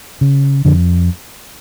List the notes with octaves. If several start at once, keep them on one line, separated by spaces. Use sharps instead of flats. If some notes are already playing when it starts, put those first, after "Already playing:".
C#3
F2 D3